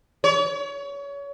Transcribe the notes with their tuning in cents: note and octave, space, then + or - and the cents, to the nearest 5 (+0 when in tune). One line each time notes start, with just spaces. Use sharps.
C#5 +30